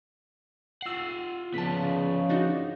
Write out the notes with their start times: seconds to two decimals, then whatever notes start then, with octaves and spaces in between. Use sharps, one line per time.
0.82 F4 F#5 E6 C7
1.54 C#3 F3 B3 A5 B6
2.29 D4 D#4 F#4